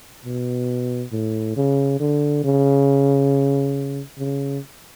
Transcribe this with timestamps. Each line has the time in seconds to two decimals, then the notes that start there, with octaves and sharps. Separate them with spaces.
0.25 B2
1.12 A2
1.56 C#3
2.00 D3
2.44 C#3
4.19 C#3